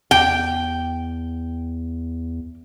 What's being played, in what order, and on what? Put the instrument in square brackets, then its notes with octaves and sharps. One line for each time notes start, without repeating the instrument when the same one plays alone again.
[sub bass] E2 [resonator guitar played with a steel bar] G5